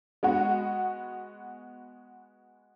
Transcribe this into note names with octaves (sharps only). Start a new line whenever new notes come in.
G#3 B3 F#4